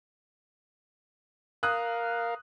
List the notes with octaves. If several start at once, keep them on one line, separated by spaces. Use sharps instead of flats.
A#4 F5 D#6 F#6